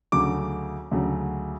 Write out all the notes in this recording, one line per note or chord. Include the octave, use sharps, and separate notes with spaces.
D2 C#3 F#3 D6
D2 C#3 F#3